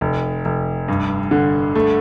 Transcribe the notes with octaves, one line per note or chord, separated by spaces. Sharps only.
F1
F1
G2
D3
A3